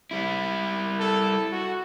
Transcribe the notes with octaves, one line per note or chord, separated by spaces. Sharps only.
G3 E4
A4
F#4